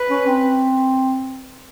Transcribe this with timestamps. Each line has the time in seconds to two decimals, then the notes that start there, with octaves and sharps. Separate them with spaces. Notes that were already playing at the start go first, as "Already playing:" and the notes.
Already playing: B4
0.10 C#4
0.26 C4